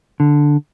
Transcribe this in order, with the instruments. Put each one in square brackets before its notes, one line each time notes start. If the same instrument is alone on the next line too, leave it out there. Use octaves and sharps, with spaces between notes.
[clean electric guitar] D3